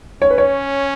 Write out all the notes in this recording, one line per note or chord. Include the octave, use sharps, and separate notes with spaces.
C#4 C#5
B4
C#5